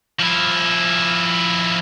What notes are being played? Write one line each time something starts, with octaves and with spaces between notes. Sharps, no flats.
F3 E4